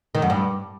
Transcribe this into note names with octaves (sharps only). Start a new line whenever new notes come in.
D#3
F#2
G2